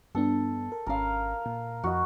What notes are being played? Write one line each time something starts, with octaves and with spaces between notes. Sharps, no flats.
G2 B3 D4 A4
A#4
G#1 C#4 A#4 F5
A#2
F2 F#4 D#5